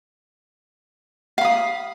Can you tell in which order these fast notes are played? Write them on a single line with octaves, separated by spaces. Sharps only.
F5 B5 D#6